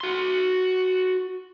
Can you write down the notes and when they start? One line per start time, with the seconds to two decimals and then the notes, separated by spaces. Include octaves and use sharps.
0.01 F#4 C6